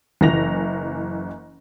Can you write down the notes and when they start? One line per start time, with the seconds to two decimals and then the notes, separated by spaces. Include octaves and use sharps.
0.21 F#1 E3 A#6 F7